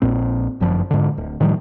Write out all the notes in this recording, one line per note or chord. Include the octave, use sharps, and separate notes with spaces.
A#1 A#2 C4
G1 F#2 F3
G#2 D3
D1
A2 D#3 F3 G3